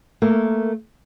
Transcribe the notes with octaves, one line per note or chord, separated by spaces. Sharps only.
A3 A#3 A#4